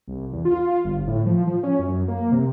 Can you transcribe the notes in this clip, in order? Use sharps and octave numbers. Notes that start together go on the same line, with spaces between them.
C2
E2
F4
G1
A2
F3
F3
C#4
F#2
A#3
C3